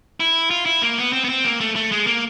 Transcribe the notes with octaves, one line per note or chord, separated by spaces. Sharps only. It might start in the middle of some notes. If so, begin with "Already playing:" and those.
E4
F4
E4
A#3
B3
C4
B3
C4
A#3
A3
A3
G#3
A#3